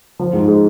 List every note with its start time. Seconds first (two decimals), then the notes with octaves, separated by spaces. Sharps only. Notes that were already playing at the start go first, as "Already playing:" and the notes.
0.19 F3
0.33 G#2
0.48 G#3